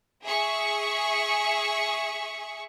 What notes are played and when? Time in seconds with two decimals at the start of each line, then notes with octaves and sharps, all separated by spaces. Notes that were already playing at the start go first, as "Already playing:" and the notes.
0.24 G#4 E5 C#6